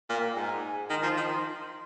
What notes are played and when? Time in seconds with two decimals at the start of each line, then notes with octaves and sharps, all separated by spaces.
0.09 A#2 F5
0.18 G5
0.36 G#2 G#5
0.90 D#3 C6
1.03 F3
1.17 D#3